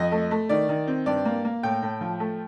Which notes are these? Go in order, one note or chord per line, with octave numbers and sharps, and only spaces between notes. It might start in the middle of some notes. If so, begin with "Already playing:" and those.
Already playing: F2 D#5
A3
A3
D#3 D5
D#3
C4
G2 D5
A#3
A#3
A2 G5
A2
F3
A3